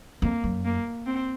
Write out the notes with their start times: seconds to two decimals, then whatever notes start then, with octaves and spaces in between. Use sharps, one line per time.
0.22 F2 A#3
0.44 F#2
0.65 A#3
1.06 C4